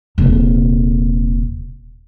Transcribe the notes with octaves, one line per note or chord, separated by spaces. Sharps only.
D#1 C3